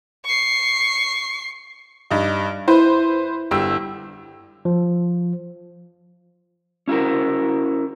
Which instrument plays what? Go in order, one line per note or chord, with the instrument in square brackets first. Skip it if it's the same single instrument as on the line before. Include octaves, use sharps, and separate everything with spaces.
[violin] C#6 C7
[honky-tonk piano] G2 D#4
[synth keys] E4 [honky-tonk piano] B4 C5
[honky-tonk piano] G1 G3 E6
[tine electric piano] F3
[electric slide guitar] C#4 E4 F#4 A#4